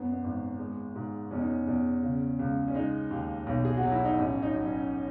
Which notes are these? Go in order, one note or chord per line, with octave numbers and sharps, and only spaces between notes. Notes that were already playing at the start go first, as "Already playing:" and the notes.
Already playing: F#2 B3
B3
G#1
G#3
G#2
E2 C#4
D#4
C#4
E2
C#3
C#2
C#4
G#3 D#4
D#2
B1
G#4
F#4
F#3
E4
D#4
A1 C#4
D#4
F#3
C#4